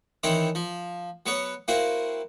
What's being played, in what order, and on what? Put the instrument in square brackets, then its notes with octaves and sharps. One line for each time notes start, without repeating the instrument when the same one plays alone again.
[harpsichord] D#3 E3 C4 E4 C#5
F3
F#3 B3 B4 C#5
A#3 C4 E4 F#4